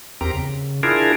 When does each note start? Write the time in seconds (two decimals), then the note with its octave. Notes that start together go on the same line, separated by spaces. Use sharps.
0.21 E2 C4 G4 A#4 A#5
0.33 C#3
0.83 D4 E4 F4 G#4 A#4